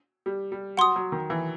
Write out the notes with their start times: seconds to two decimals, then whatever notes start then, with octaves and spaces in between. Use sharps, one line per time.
0.26 G3
0.52 G3
0.77 F#3 F#5 C6 D#6
0.96 F#3
1.12 D#3
1.30 E3